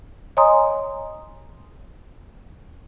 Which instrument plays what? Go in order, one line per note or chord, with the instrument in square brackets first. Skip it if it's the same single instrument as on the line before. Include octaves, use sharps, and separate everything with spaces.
[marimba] C#5 D#5 G#5 A#5 C6 D#6